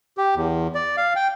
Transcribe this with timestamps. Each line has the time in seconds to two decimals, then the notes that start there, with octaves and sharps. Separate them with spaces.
0.18 G4
0.35 E2
0.75 D5
0.97 F5
1.16 G5